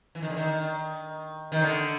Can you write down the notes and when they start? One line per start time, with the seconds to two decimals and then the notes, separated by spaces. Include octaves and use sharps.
0.15 E3
0.23 D#3
0.30 D3
0.37 D#3
1.52 D#3
1.63 D3